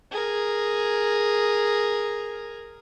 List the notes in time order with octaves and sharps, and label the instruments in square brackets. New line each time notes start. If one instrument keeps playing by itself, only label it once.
[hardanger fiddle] G#4 A#4